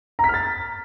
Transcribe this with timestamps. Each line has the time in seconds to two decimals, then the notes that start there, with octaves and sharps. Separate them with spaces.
0.19 A#5
0.24 B6
0.29 F6
0.34 A6